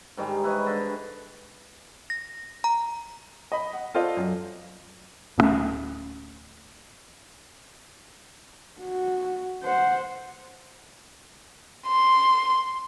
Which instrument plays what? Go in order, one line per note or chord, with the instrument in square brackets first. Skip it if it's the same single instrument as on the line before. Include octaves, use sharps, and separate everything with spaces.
[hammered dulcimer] G#2 D#3 G3 G#3
E4 B4 C#5 D#5
D3
[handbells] A#6
A#5
[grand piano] D#5 B5
F#5
F4 A4 C5 D5 D#5 F5
F#2
[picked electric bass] D1 G2 A3 C#4
[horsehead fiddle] F#4
C5 F#5
[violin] C6